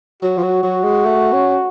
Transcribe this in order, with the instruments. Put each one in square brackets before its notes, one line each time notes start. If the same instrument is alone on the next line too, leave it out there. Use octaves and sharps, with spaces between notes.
[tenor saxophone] F#3 [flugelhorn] F#4
[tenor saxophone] F3
F#3
F#3
G#3
A3
C#4